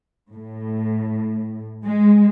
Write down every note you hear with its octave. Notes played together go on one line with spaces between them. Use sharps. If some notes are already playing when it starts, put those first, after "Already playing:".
A2
G#3